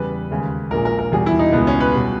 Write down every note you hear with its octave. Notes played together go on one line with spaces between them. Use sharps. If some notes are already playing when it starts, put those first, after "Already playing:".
Already playing: E2 C#3 G3 B4
D#2 C#3 G#3
A#1 A#2 G#3 A#4
A#4
A#4
E2 B2 G3 G#4
E4
D#4
C#2 B2 G#3 B3
C#4
B4
B2 G3